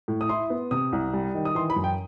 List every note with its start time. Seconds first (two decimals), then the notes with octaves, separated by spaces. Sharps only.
0.08 A2
0.21 D#6
0.29 E4 C6
0.50 B3
0.71 C3 D#6
0.92 C2
1.13 G3
1.34 D#3
1.45 D#6
1.55 E3 C6
1.70 B5
1.76 F#2
1.84 G5